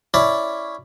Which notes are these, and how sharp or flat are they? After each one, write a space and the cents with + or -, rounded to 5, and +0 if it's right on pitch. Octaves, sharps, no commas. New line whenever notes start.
C#4 +0 E4 +0 D5 +0